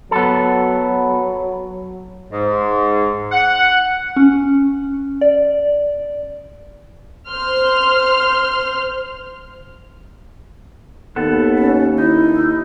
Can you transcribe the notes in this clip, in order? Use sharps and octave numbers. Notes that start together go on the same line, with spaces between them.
F#3 B3 A4
G#2
F#5
C#4
D5
C5 C6 F6
D#2 B3 A4
C#4
D#4 E4
D#2